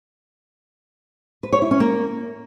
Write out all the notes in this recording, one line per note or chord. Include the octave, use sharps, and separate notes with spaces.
B4
C#5
E4
C#4
A#3